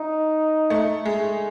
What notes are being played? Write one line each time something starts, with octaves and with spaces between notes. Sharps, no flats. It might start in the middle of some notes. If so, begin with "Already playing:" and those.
Already playing: D#4
A3
G#3